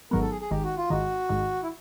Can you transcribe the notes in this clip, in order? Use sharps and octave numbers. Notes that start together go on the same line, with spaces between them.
G#1 G#2 D#3 F#3 B3 A#4
A4
G#4
G#4
G#1 G#2 D#3 G4
F#4
F4
G#1 G#2 D#3 F#4
G#1 G#2 D#3
E4